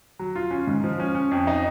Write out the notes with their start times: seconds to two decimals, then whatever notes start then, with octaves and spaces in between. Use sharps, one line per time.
0.19 F#3
0.36 F4
0.51 C#4
0.67 G#2
0.84 F3
1.00 C#4
1.15 C#4
1.31 F2
1.47 D#4